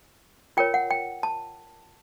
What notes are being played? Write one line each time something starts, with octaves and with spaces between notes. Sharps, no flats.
F4 A#4 C#5 G5
F#5
G5
A5